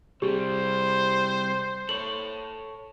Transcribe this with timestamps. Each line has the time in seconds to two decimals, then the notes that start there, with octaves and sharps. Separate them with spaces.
0.22 C3 G3 G4 G#4 C5
1.89 A4 C#5 F#7